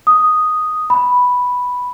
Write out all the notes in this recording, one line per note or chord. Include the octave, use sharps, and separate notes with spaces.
D#6
B5